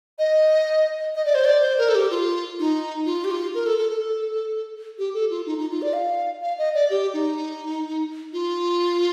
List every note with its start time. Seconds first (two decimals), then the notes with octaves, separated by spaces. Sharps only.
0.19 D#5
1.15 D#5
1.25 D5
1.35 C5
1.45 D5
1.62 C5
1.78 A#4
1.89 A4
1.95 G4
2.11 F4
2.59 D#4
3.06 F4
3.24 G4
3.31 F4
3.54 A#4
3.66 A4
3.78 A4
3.90 A4
4.98 G4
5.14 A4
5.30 F4
5.46 D#4
5.58 D#4
5.70 F4
5.82 D5
5.93 F5
6.42 F5
6.58 D#5
6.74 D5
6.90 G4
7.14 D#4
8.33 F4